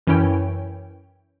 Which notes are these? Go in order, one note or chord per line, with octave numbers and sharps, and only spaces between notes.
F#2 E3 C#4 E4 C#5 G5